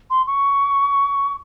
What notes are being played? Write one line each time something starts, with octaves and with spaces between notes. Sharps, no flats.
C6
C#6